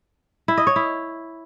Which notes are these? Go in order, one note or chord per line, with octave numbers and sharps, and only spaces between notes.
E4
D#5
C#5
E4